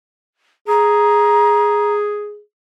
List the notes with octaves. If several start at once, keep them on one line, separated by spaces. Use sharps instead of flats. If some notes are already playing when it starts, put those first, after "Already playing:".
G#4 A#5